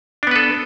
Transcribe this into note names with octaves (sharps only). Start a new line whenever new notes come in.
B3 D4 A4 B4